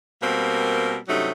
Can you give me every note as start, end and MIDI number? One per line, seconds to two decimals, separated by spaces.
0.22 0.97 47
0.22 0.97 55
0.22 0.97 58
0.22 0.97 60
0.22 0.97 70
1.08 1.31 43
1.08 1.31 48
1.08 1.31 54
1.08 1.31 57
1.08 1.31 61
1.08 1.31 63